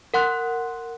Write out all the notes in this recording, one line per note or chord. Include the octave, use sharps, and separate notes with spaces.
A#4 F#5 C6 F#6